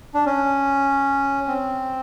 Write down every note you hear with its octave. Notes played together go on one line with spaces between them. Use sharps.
D4
C#4
C4